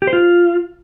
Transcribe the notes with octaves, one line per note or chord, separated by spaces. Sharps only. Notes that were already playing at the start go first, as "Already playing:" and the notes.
G4
C5
F4